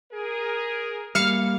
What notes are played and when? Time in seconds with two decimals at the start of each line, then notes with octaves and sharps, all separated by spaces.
0.12 G#4 A#4
1.15 G3 A#3 F5 F6 C#7